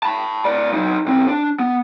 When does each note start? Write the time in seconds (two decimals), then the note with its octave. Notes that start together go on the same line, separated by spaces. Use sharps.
0.03 A5 B5
0.45 A2 D5
0.74 F#3 D#4
1.06 B1 C4
1.28 D4
1.59 B3